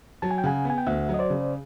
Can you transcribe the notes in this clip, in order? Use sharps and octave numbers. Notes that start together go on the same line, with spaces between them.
F#3 A5
G#5
G5
C#3 F#5 G#5
B3 G#5
G5
D2 E5 F#5
F#3
D#5
C5 D5
C#3